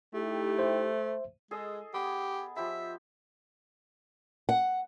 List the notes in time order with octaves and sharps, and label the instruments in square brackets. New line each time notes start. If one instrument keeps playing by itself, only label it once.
[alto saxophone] A3 [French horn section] D#4 E4 G4
[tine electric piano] C5 E5
[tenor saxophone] G#3 [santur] G#4 A4 D#5
[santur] B3 [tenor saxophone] G4
[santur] F3 G4 B5 [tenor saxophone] E5
[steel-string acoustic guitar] F#5